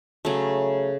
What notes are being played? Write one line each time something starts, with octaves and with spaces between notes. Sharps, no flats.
C#3 F#3 A3